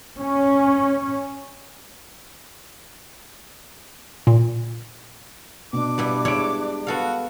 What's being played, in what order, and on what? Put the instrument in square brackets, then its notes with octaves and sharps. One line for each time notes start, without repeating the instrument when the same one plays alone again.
[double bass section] C#4
[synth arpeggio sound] A#2
[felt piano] B2 [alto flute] D4 [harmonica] D6
[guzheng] G3 B3 E4
[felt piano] G#3 D7 [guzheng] E4 C#5
[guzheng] B3 A4 F5 [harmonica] F#4